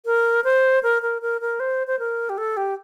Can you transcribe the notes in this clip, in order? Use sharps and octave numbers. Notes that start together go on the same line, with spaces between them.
A#4
C5
A#4
A#4
A#4
A#4
C5
C5
A#4
G4
A4
G4